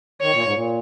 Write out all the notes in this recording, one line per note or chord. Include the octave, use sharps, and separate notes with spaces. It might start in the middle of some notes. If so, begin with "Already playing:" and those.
D#3 C#5
A#2
G#2
A#2